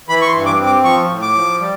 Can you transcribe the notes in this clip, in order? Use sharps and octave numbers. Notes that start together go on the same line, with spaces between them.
E3 B5
C#6
C6
G2
D6
C4
D6
F3 C#6
A2
D6
F3
G3